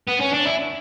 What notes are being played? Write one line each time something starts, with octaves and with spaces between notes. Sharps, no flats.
B3
C#4
D4
E4